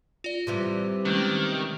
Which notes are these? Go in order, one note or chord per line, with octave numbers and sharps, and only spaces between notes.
F4 D5
C3 E3 G3
D#3 G#3 A3 C#4